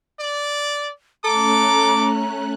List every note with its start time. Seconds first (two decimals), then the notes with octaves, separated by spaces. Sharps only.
0.20 D5
1.24 A3 C#4 A4 A#5 D6 F#6